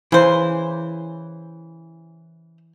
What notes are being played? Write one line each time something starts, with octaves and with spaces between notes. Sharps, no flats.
C#3 E3 C5